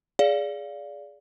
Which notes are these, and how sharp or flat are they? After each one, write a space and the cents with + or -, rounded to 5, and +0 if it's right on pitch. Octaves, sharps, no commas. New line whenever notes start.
G#4 +0 D5 -20 F5 +0